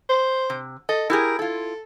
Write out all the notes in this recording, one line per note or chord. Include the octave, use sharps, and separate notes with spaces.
C5
C3
A4 D#5
E4 G4 G#4 A#4
E4 F4 A4